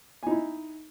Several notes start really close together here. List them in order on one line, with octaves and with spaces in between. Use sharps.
G#5 D#4 E4